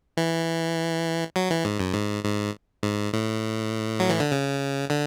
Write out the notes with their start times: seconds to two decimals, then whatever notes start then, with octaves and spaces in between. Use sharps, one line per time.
0.17 E3
1.36 F#3
1.51 E3
1.65 G#2
1.80 F#2
1.94 G#2
2.24 G#2
2.83 G#2
3.13 A2
4.00 F#3
4.10 E3
4.20 D3
4.32 C#3
4.90 D3